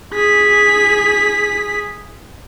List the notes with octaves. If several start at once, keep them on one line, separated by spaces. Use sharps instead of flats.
G#4 B6